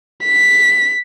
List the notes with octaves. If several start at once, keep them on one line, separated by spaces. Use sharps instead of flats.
B6